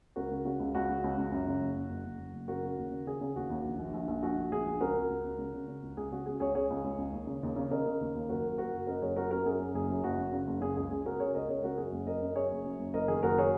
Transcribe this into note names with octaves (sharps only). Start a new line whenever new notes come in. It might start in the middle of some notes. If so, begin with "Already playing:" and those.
C#2 F#4 A#4
C#3
C#3 F#4
C#2
C#2 F#4
C#3
C#2
C#2
F#2
C#3
F#1
F#1
F#1
F#1
F#1
F#1
C#3 F#4 A#4
C#3
D#2
C#3
C#3 G#4
C#3
D#2 F#4
D#2
A#1
A#1
A#1
A#1
A#1 F#4
A#1
A#1 G#4
A#1
C#2 F#4 A#4
C#2
C#2
C#2
C#3
C#3
C#3
C#2
C#2 G#4
C#3 F#4
C#3 G#4
C#2 G#4 C#5
C#2 G#4 C#5
C#2
C#2
C#2
D#2
C#3
D#2
C#3
C#3 A#4 D#5
C#3
D#2
D#2
F#1 F#4 A#4
F#1
F#1 F#4 A#4
F#1
F#2 A#4 D#5
F#1 G#4 C#5
F#2 F#4 A#4
F#2 F#4 A#4
F#2 G#4
F#2
F#1 G#4
F#2
F#1 F#4
F#1
C#3
F#1
C#3 G#4
C#2 G#4
C#3 G#4
C#3 F#4 A#4
C#3 G#4 C#5
C#2 A#4 D#5
C#2 G#4 C#5
C#3 F#4 A#4
F#2 G#4
F#1
F#2 A#4 D#5
F#2
F#2 G#4 C#5
F#1
F#2
F#1
F#1 A#4 D#5
D#3 G#4
F#1 F#4 A#4
G#4 C#5